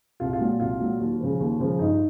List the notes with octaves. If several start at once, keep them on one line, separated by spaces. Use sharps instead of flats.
C2 F4
F4
A#2 F#3
C2 F4
A#2 F#3
D#2
C#3 F3
D#2
C#3 F3
G2 D#4